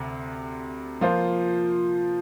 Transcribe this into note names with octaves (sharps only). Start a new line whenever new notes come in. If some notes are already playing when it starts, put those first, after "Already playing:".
Already playing: D2 C3
F3 A#3 F4 C5